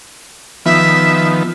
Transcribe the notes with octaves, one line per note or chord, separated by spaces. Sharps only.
D#3 F3 B3 E5